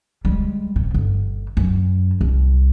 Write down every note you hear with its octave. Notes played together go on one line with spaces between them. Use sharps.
G3 G#3
C3
G1
F#2
C2